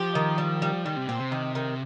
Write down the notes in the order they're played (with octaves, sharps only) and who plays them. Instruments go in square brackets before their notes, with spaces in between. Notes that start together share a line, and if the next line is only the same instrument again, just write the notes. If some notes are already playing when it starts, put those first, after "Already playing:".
Already playing: [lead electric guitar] F3 [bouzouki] G4
[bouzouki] D#3
G3
G3
[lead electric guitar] D#3 [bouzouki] G3
[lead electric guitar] C3
[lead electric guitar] A#2 [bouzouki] C4
[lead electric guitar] C3
[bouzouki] D#3
D#3